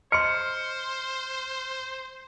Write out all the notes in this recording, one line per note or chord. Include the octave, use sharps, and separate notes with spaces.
C5 D#5 C6 F6 C#7